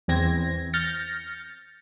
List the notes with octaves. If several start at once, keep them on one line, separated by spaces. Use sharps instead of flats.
E2 E3 C4 G#6 A#6
F6 G6 A6 A#6 C#7